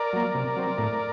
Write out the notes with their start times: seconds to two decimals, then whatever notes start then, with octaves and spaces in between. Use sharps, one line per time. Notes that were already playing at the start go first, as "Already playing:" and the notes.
Already playing: A#4 D5
0.13 F#3 A#3
0.34 C3
0.56 F#3 C4
0.78 A2